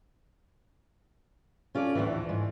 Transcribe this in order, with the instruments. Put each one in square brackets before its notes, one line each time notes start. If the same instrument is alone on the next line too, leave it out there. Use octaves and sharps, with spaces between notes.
[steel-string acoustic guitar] C#4 F4 A4 D5
D2 A2 E3
G#2